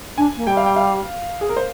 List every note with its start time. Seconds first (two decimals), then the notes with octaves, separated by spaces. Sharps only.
0.17 D4 G#5
0.37 A#3
0.47 G3 G5
0.57 F5
0.66 G5
0.76 F5
1.41 G#4
1.49 A#4
1.56 C5